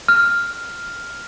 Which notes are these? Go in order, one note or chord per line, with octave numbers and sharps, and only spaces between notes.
F6